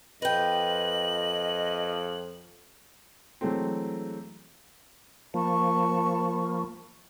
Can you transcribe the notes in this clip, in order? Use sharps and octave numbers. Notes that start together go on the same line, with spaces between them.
F2 B4 D#5 G5 F#7
E3 F#3 G#3 A3 C4
F3 A#3 A5 B5 C#6